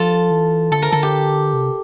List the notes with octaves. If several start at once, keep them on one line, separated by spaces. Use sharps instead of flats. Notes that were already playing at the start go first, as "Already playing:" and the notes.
Already playing: F3 F4 A4
E3
D3 A4
A#4
D3 A4
G4
C3